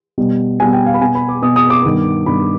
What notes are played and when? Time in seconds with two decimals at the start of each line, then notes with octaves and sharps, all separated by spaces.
0.18 B2 G3 B3
0.59 B2 G3 B3 G#5
0.73 G5
0.86 F5
0.94 B5
1.00 B2 B3 G#5
1.15 B5
1.29 D6
1.42 B2 B3 D#6
1.56 D#6
1.70 D6
1.84 G2 D#3 B3
2.26 G2 D#3 B3 B5